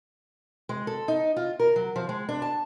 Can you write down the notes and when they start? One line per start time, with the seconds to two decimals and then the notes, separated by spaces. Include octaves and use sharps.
0.69 G#3
0.87 A4
1.08 D#4
1.36 F4
1.60 A#4
1.76 F#3
1.96 F3
2.09 G#3
2.29 D4
2.42 A5